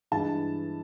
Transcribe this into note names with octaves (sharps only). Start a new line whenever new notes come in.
G2 E3 G#3 A5